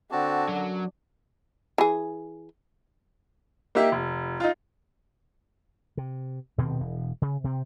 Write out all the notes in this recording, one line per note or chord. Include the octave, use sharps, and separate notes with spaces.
D3 C4 F#4 A5
F#2 F#3
E3 G#4
A#3 D#4 G4 E5
F1
D#4 F4
C3
D#1 B2 D#3 C4
E1
C#3
C3 C4